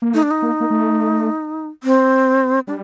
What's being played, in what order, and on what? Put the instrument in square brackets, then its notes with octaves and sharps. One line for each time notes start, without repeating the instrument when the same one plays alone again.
[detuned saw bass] A#3
[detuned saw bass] A3 [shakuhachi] D#4
[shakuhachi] D4
D#4
[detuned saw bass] A#3
A#3
A3
[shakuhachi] C4
[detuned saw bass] G3 [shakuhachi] D4